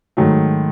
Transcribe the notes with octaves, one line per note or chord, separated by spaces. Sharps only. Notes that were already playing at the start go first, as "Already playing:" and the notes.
G#2 D#3 F#3 A3